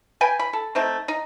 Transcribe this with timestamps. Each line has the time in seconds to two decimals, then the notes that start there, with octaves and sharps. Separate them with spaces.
0.21 B4 G5 G#5
0.39 B5
0.53 A4
0.75 A3 C4 D#4
1.08 D#4